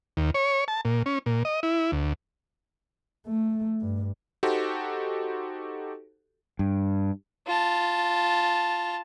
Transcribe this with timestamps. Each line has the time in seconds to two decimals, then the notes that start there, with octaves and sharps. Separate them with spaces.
0.17 D#2
0.34 C#5
0.68 A5
0.85 A#2
1.06 C#4
1.26 A#2
1.45 D#5
1.63 E4
1.92 D2
3.28 A3
3.81 G2
4.43 D#4 F#4 G4 A4 C5
6.59 G2
7.47 F4 A5